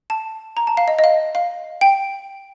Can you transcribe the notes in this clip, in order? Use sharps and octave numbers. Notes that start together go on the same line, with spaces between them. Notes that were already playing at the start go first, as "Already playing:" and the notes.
A5
A#5
A5
F5
D#5
D#5
F5
F5
G5